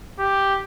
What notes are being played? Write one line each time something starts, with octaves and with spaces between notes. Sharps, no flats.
G4